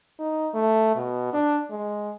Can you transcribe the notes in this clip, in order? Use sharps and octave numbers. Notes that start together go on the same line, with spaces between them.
D#4
A3
B2
D4
G#3